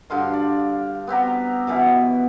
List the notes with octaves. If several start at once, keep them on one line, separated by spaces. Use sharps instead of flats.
G2 D3 F5 C6
D5
B3 C4 G4 A#5
F#2 B2 E3